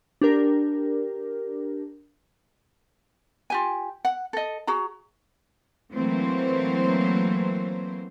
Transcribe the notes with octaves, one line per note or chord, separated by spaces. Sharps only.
D4 G4 A#4
F4 G4 G#5
F#5
A4 D#5
F#4 G#4 A#5
E3 F#3 A3 A#3 C4 C5